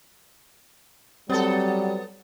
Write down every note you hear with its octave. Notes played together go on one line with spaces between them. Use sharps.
F#3 G3 B3 C4 A4 A6